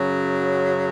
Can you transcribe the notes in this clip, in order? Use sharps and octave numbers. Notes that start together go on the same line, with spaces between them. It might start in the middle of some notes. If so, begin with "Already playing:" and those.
Already playing: F#2 C#3 F#3